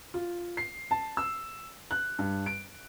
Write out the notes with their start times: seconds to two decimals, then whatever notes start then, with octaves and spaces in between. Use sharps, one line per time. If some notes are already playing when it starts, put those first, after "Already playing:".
0.14 F4
0.57 C7
0.91 A5
1.17 E6
1.91 F#6
2.19 G2
2.46 D7